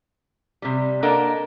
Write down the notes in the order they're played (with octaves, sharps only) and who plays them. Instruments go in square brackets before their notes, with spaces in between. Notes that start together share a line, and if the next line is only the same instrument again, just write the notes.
[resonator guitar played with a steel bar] C3 G3
A#3 D4 A4 A#4 D#5 F#5